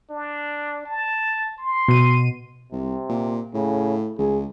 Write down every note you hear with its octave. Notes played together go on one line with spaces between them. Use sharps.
D4
A5
C6
B2 D#7
C2 C3
A#2
A2 C#3
C#2 G#4